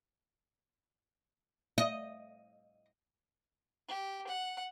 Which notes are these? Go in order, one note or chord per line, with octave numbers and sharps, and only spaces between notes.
D#5
G4
F#5